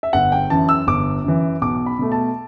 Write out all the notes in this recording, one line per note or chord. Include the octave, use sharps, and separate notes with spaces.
E5
G1 F#5
G5
F#2 E3 A5
E6
G1 D6
F#2 E3
B1 D6
B5
B2 A3
A5